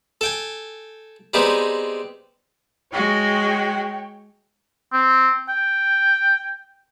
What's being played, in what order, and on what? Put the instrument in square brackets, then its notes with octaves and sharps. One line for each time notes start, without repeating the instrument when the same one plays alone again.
[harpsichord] A4 G5 G#5
G3 G#3 B3 C4 D#4
[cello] G#3 F#4 [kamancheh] C#5 G5
[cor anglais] C4
G5